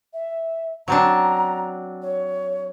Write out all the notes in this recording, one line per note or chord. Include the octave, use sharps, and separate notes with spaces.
E5
F#3 C4 D4 A#5
C#5